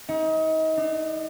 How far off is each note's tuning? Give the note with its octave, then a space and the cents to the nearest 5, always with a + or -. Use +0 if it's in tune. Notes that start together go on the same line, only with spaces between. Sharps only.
D#4 +30
D#4 -45